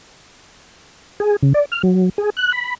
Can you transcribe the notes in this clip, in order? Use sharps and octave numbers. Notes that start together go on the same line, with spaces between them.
G#4
C#3
D5
F6
F#3
G#4
F#6
B5